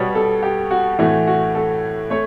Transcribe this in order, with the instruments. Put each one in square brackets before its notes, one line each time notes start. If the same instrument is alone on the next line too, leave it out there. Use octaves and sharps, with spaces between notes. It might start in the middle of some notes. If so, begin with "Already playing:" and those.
Already playing: [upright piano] B2 G3 B3 C#5
A4
G4
F#4
A2 E3 A3 F#4
F#4
A4
A3 C#5